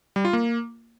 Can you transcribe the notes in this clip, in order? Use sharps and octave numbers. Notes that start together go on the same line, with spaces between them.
G3
F4
A#3